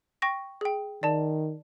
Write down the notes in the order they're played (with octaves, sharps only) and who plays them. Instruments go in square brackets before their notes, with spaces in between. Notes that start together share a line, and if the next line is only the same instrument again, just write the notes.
[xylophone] G5 C#6 A#6
G#4 G5
[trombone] D#3 [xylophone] D5 A5